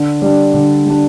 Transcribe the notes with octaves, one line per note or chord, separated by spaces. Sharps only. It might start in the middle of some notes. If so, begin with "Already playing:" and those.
Already playing: D3
G3 D4
D3
G3 D4